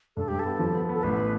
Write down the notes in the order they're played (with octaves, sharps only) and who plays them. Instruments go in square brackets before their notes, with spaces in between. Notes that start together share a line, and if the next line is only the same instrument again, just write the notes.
[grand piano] G2 [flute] A4
[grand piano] G2 [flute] G4
[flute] A4
[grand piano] B3
F3
B3
B3
[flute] A4
[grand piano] A1 [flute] B4